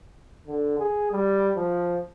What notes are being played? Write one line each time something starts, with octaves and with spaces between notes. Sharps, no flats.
D3
G#4
G3
F3